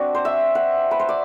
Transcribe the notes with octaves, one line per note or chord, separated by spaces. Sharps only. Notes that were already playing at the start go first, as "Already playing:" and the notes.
Already playing: C4 D4 F#4
C5
E5
F#5
B4
C5
D5